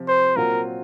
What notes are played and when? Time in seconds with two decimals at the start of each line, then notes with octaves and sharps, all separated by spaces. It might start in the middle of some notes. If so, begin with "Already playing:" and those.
Already playing: C3 F3 C4
0.08 C5
0.36 A#2 F#3 C4 F4 A#4